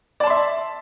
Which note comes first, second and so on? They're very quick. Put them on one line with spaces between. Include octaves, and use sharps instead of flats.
D5 A5 C6 E5